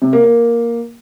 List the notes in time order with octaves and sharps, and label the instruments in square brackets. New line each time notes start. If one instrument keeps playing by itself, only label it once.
[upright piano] C3
A#3
A#3